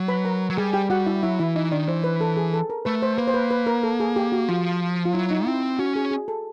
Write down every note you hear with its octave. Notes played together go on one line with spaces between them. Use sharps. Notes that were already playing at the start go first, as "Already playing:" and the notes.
Already playing: F#3
B4 B5
A#4 A#5
F#3
G3 G#4 G#5
G4 G5
G3 F#4 F#5
E4 E5
F#3 E4 E5
E3 E4 E5
E3 D#4 D#5
D#3 D4 D5
E3 C5
B4
A4
G#4
A4
A#4
A3 B4
C5
A#3 B4
C5
B4
B4
A#4
A4
G#4
G4
F#4
F3 F4
F4
F#3 E4
D#4
C4 E4
C#4 F#4
G#4
G#4
A4